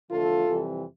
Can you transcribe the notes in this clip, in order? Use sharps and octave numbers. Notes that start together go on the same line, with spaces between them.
E2 D3 F3 A3 F4 A4
F2 C3 E3 G3